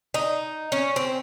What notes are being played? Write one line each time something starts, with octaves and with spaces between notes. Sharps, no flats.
D#4
C#4
C4